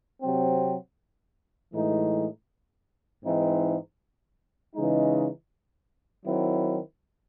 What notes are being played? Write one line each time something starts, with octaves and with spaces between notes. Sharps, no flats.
C3 F#3 C4
A2 E3 G#3 D#4
G#2 E3 C4 D#4
C#3 E3 G#3 D#4
D#3 F#3 C4 E4